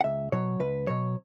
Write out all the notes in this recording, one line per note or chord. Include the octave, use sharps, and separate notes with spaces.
F#5
C#2 E5
B2 F#3 C#5
C#2 B4
B2 F#3 C#5